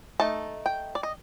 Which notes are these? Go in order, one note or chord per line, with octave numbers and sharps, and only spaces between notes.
A3 D#4 A5
G5
D5
D#5